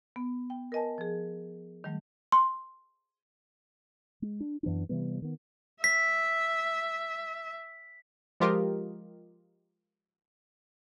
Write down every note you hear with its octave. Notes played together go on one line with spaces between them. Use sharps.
B3
G5
A#4 B4 D#5 G#5 A5
F3 G#4
D#3 F#3 G3 A3
C6
G#3
D4
F#2 E3 B3 D4
C3 E3 G3 B3
D#3 B3
E5 B6
F3 G#3 F4 G4 A#4 D#5